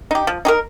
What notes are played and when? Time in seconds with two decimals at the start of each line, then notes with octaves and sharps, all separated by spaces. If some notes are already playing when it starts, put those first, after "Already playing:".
0.11 D#4 G4
0.27 F3
0.45 D#4 G4 A#4